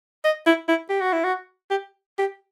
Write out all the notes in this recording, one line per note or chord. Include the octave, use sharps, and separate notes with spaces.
D#5
E4
E4
G4
F#4
E4
F#4
G4
G4